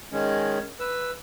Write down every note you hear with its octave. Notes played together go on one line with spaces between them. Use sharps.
D#3 G#3 C#4
B4 E6